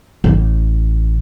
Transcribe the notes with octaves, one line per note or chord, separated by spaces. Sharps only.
A1